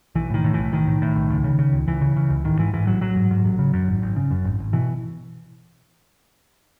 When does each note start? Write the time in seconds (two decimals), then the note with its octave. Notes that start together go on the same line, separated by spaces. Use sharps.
0.15 B1 E3
0.30 A2 D#3
0.44 A2
0.54 B1 E3
0.72 B1 D#3
0.87 A2
1.02 A2
1.16 B1
1.30 C#2
1.44 C#3
1.59 C#3
1.73 C#2
1.87 C#2 E3
2.01 C#3
2.16 C#3
2.30 C#2
2.44 A1 D#3
2.59 G#2 E3
2.74 G#2 E3
2.87 A1 F#3
3.01 A1 F#3
3.16 G#2
3.31 G#2
3.44 A1
3.59 C#3
3.73 F#2
3.87 G#1
4.02 G#1
4.16 C#3
4.31 F#2
4.44 G#1
4.59 G#1
4.73 B2 E3